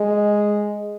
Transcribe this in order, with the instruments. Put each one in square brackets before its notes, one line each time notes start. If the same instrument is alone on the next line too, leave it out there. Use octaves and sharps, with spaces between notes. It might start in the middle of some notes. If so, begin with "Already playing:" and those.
Already playing: [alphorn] G#3